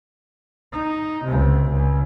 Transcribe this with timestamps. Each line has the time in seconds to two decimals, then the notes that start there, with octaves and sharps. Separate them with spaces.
0.73 D#4
1.25 C#2 C3
1.70 C#2